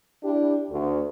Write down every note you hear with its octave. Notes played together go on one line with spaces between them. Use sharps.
D4 E4 G4
D2